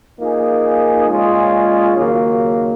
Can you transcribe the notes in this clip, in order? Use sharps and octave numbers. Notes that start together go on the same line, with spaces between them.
F3 A#3 D#4 G#4
A#2 G#3 C#4 F4 G#4
D#2 C#3 F#3 A#3